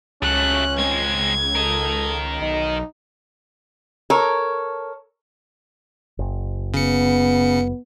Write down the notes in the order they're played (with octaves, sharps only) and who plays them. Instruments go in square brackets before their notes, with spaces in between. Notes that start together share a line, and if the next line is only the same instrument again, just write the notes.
[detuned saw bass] C#2 [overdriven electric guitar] F#3 A3 [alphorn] C#4 [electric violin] F#6
[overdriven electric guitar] G#3 C4 [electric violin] G#6
[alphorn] A4 [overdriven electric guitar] A#4 D#5
[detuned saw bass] B1 [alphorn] D#4
[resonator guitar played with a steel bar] A4 A#4 C#5
[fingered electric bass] F#1
[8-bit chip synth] C#3 C#7 [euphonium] B3